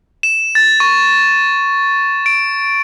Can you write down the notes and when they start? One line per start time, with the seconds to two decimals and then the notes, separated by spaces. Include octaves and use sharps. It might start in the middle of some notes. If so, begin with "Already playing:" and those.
0.23 E7
0.55 A6
0.80 C#6
2.26 D7